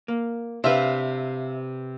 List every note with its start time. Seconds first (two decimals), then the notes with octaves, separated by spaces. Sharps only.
0.08 A#3
0.64 C3 D4 B4 C5 E5 F5